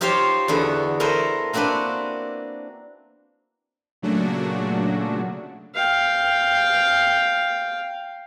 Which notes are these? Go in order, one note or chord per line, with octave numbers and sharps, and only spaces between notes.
D#4 F4 G4 C5 C#5 F5
E2 D3 B3 F#4 E5
E4 A4 A#4 C5 D#5
A#3 C4 D4 F#4 B4
A#2 C#3 F#3 A3 D4 F#4
F5 G5